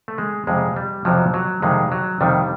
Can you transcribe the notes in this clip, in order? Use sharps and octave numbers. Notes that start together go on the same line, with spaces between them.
A3
G#3
F2 C3 F3 G#3
G3
F2 C3 F3 F#3
F#3
F2 C3 D#3 G#3
F#3
F2 C3 D#3 G3